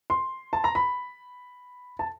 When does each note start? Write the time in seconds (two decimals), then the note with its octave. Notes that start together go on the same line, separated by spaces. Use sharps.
0.10 C6
0.53 A5
0.64 A#5
0.75 B5
1.99 A5